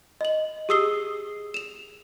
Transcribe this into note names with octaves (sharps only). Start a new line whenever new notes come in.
D#5 F#7
G4 G#4 D#6 E6 C7 G7
E7 F7